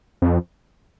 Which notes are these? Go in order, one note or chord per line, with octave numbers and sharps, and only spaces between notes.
F2